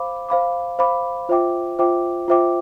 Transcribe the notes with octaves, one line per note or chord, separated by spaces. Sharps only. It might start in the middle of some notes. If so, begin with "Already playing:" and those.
Already playing: C5 F5 B5 D6
C5 F5 B5 D6
C5 F5 B5 D6
F4 C5 E5 G5 D6
F4 C5 E5 G5 D6
F4 C5 E5 G5 D6